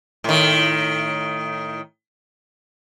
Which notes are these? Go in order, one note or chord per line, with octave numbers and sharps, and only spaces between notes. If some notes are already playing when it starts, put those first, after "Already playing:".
A2 D#3